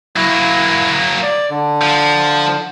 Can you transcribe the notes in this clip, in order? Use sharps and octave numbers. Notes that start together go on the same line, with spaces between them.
F#3 A#3 E4
D5
D3
F3